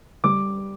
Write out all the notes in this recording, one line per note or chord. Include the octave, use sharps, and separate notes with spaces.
G3 D6